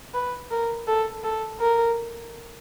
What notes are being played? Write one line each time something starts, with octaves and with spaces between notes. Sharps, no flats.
B4
A#4
A4
A4
A#4